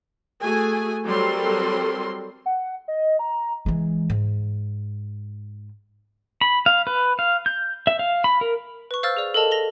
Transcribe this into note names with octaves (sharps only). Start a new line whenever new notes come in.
A3 F#4 G#4 G#5
F#3 G3 C4 A4 A#4 C6
F#5
D#5
A#5
E3 G#3
G#2
B5
F5
B4
F5
G6
E5
F5
B5
A#4
B4 C#6
C5 F5 E6 F6 A6
G#4 D5
A4 A#4 D#5 A5 F7
A#6 F7 G7